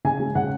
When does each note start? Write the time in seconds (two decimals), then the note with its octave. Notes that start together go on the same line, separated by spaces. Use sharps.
0.04 C#3 G#5
0.20 G#3
0.35 C#3 F#5